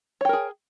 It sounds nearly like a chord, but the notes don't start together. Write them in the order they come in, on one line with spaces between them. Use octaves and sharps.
C#5 G5 A#4 G#4